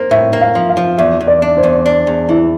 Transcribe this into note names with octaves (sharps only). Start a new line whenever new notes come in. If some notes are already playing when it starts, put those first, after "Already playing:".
Already playing: A#3 C5
A2 E5
A#3
F5
F3
F5
F3
E2 E5
E2
D5
D4
C5
E2
D4
E2
E3 E4